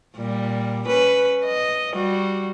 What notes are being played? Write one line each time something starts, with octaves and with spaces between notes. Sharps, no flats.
A#2 G3
C#4 B4
D#5
G3 F#4